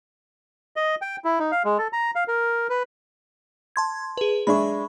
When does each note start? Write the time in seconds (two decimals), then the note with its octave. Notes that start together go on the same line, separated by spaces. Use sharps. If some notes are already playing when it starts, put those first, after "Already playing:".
0.76 D#5
1.02 G5
1.25 E4
1.39 D#4
1.52 F5
1.65 G#3
1.78 A4
1.93 A#5
2.15 F5
2.28 A#4
2.69 B4
3.76 A5 C6 G#6
4.17 G#4 B4
4.47 G#3 D4 E5 B5 C#6